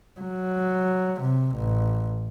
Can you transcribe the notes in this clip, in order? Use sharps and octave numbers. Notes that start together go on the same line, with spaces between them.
F#3
C3
A1